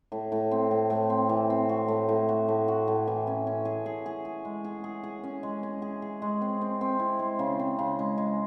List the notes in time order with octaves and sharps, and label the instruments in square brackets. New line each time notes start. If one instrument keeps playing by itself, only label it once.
[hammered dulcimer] A2
A2
C4
A2
A2
C4
E3
C4
F#4
A2
A2
F#4
A2
F#4
A2
E3
C#4
C#4
G#4
G#4
G#4
G#4
G#3
G#4
G#4
G#4
C#4
G#3
C#4
G#4
G#4
G#3
C4
C4
C4
E4
G#3
C#3
C4
C#3
G#3
G#3